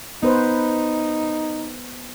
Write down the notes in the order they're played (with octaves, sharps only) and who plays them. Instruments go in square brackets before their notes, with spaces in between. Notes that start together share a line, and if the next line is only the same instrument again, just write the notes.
[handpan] B3 B4 C5 [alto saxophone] D#4